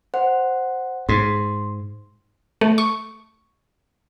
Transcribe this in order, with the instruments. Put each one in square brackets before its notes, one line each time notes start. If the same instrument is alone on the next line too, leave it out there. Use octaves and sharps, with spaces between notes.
[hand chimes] C5 F#5
[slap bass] G#2 [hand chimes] C6
[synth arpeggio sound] A3
C#6